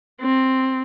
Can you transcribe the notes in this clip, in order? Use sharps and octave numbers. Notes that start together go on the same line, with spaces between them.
C4